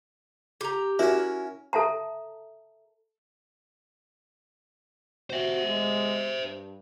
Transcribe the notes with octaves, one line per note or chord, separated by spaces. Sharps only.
G4 A#5
C#4 E4 F#4 A#4
A4 E5 A5 A#5
F#4 C5 E5
G#3
G2